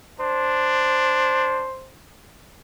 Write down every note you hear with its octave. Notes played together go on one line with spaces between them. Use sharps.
D4 C5